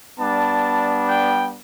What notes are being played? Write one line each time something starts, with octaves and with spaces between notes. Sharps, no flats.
G3 B3 D4 A5
G5